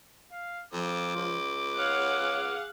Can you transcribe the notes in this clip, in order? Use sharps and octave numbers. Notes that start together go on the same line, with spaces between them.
F5
F2 F3 D6
C#2
G#4 C#5 F5 F#5